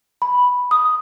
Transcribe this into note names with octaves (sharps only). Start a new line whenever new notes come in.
B5
D#6